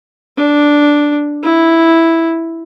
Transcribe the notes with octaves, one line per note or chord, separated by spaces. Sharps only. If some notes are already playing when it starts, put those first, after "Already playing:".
D4
E4